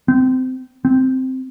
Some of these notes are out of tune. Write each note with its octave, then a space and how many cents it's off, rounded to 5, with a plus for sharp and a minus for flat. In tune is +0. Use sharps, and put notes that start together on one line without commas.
C4 -25
C4 -5